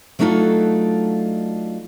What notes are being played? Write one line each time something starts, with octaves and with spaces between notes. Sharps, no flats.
F#3 A3 D4 D#4 F4 A4